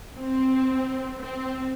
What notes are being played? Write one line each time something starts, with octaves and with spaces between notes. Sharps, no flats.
C4
C4